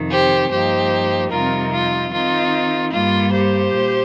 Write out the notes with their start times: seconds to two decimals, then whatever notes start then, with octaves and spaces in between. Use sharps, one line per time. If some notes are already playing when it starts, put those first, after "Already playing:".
Already playing: F2 C3 D#3
0.10 G4 C5
0.50 G2 F3 A#3 D#4 G4 C5
1.31 F2 C3 G3 C4 D#4 F4 A#4
1.71 F4
2.12 D#3 C4 D#4 F4
2.92 G2 G3 A#3 F4
3.32 G4 C5
3.73 A#2